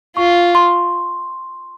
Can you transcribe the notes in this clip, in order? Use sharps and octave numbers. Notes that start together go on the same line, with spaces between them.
F4 C#6
C6